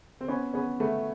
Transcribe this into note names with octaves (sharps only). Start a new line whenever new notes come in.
C4
B3 C#4
B3 C#4
A3 B3